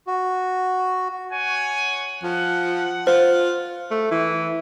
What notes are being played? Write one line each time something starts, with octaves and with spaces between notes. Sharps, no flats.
F#4
C#5 F#5 G#5
F3 F#5
F4 C5
A3
E3